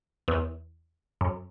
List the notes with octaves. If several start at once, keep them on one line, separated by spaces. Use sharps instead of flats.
E2
F#2